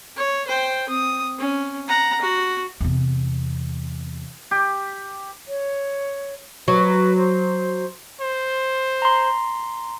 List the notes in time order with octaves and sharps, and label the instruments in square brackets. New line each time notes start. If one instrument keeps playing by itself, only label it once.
[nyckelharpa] C#5
C5 G5
C4 D#6
C#4
F#5 A#5
F#4
[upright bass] E2 C3
[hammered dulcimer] G4
[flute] C#5
[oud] F#3 [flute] B4
[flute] C5
[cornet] C5
[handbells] A#5 C6